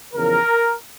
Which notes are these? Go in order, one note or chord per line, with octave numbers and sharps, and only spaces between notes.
E2 C#3 F3 A#4